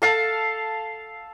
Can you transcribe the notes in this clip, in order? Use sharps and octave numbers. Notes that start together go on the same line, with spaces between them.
A4 F5 A5